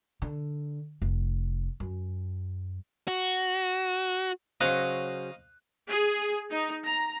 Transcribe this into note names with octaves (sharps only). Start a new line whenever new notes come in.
D3
F1
F#2
F#4
C#3 F#3 C5 D#5 F5 F#6
G#4
D#4
A#5